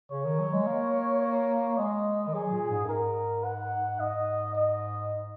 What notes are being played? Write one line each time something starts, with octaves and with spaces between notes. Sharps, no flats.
C#3 C#5
D#3
F#3
G#3
A#3
C#5
G#3 D#5
D#3
F#3 G#4
A#2
G#2
F#2
G#2 A#4
F#5
G#2 D#5
D#5